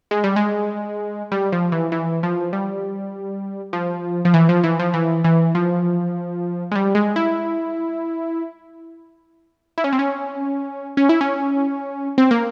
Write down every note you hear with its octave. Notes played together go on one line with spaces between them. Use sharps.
G#3
G3
G#3
G3
F3
E3
E3
F3
G3
F3
F3
E3
F3
E3
F3
E3
E3
F3
G#3
G3
G#3
E4
E4
C#4
C4
C#4
C#4
E4
C#4
C4
A#3